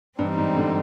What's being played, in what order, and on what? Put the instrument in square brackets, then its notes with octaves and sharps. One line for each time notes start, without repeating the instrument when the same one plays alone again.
[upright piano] G2 [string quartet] E3 G3 C4 D#4
[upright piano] G#2
D3